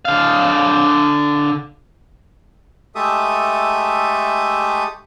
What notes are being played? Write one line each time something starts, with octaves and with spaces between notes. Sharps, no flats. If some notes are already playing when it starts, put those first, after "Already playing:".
D3 F5
G#3 A3 G4 A4 E5 D#6